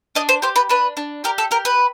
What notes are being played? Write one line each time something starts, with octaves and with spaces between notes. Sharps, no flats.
D4 D#5
C5
G4 C5
B4
D4 B4
D4
G4 A#4
A4
G4 A#4
B4